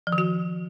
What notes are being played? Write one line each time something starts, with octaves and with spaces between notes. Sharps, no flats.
F3
D#3
F#4